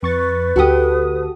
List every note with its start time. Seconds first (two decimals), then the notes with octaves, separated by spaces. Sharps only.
0.03 F2 B4 C#6 A6
0.56 D2 F#4 G4 A4 D#6